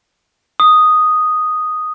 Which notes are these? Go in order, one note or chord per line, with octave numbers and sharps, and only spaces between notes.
D#6